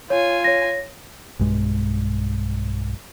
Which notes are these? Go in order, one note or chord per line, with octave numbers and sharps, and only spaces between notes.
F4 C#5 G#5
C#5 A#6
B1 G2 G#3